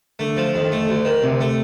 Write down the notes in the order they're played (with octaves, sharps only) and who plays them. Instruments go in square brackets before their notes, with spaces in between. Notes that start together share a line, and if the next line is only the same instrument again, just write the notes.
[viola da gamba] D3 [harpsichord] A3
[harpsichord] F3
[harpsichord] F2 [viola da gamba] D#3
[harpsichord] A3
D2
D#3
[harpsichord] D2 [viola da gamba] C3
[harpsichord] A3